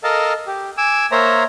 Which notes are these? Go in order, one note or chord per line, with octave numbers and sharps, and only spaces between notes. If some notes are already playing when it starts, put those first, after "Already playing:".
A4 A#4 D#5 F5 A5
G4
G#5 D6 E6
A#3 C5 C#5 E5 A#5